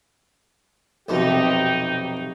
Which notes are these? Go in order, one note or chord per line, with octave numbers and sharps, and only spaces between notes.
B1 F2 C3 D#4 G4